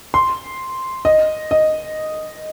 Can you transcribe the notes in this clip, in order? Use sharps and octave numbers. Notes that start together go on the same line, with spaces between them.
C6
D#5
D#5